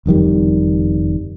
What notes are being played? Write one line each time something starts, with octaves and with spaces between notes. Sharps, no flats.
F#1 F2 D#3 G3